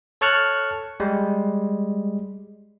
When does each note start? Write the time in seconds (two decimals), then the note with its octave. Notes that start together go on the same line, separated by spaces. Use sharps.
0.21 A4 C#5 A5 C#6 F6 F#6
1.00 G3 G#3